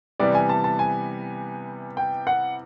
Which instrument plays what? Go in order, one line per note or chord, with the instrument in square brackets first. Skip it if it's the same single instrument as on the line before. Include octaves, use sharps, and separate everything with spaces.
[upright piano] C3 E3 G3 B3 [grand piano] D5
[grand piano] G#5
A5
A5
G#5
G5
F#5